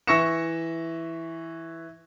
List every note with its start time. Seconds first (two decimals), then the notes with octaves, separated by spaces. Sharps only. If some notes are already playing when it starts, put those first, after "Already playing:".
0.07 E3 E5 C#6 A#6 C#7 E7